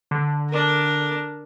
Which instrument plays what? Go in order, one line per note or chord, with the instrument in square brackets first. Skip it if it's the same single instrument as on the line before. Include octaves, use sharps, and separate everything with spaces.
[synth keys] D3
[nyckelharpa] D4 A#4